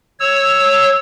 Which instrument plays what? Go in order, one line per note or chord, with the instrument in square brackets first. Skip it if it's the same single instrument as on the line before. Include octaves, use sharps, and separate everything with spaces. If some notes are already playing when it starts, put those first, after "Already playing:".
[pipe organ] C#5 E6